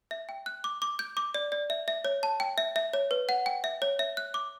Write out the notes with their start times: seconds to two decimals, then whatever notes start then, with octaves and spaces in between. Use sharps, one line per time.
0.11 E5
0.29 G5
0.46 F#6
0.64 D6
0.82 D6
0.99 G6
1.17 D6
1.35 D5
1.52 D5
1.70 E5
1.88 E5
2.05 C#5
2.23 A5
2.40 G5
2.58 E5
2.76 E5
2.93 C#5
3.11 B4
3.29 F#5
3.46 G5
3.64 E5
3.82 C#5
3.99 E5
4.17 F#6
4.34 D6